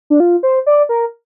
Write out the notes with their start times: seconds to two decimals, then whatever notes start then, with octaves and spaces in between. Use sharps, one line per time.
0.10 D4
0.20 F4
0.43 C5
0.66 D5
0.89 A#4